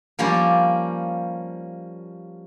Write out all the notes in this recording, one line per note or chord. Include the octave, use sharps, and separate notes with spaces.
F3 G3 A#3 C#4 D5